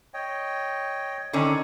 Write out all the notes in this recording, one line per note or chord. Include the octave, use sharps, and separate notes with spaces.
C#5 D#5 G5
D3 D#3 C4 C#4